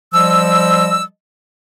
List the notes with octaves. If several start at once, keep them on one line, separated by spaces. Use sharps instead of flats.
F3 G3 D#5 E6